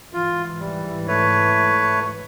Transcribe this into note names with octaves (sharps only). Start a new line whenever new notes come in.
G#2 E3 F4
G3
A3 B4 C#5